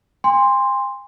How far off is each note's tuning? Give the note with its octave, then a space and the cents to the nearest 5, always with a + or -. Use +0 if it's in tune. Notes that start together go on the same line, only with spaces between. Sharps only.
G#5 -45 C6 +0